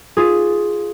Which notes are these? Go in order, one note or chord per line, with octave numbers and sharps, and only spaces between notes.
F4 G#4